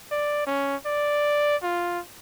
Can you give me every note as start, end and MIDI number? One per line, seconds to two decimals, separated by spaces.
0.11 0.46 74
0.47 0.76 61
0.86 1.56 74
1.63 2.00 65